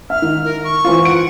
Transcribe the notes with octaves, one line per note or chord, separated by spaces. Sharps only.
E5 F6
D#3
A#4
C#6
E3 C4 F4
F#5 D7